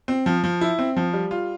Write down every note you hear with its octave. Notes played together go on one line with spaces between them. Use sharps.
C4
F3
F3
E4
C4
F3
G3
F4